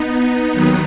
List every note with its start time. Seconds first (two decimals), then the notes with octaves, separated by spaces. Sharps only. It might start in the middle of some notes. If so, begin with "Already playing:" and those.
Already playing: B3 D#4
0.53 D#2 D#3 F#3